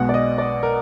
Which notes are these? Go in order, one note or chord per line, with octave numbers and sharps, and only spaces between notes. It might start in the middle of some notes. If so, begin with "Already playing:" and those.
Already playing: B1 B2 G#3 F#5
D5
D#5
D5
A#4